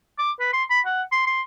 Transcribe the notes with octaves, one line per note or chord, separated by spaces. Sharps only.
D6
B4
C6
B5
F#5
C6
C6